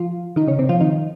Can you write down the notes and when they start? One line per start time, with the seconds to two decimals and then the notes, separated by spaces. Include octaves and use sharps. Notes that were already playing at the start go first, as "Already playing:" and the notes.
Already playing: F3 F4
0.36 D#3 D#4
0.47 C#3 C#4
0.59 C3 C4
0.69 F3 F4
0.81 D#3 D#4